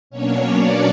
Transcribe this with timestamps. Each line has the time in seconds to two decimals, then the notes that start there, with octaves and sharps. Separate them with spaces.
0.10 B2 F#3 A#3 C#4 D4 C#5
0.47 D4 D5